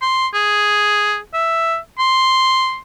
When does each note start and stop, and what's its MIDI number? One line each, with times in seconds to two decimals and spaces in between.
0.02 0.27 84
0.34 1.18 68
1.34 1.77 76
1.99 2.78 84